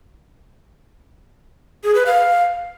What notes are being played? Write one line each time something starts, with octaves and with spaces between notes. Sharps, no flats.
G#4
B4
F5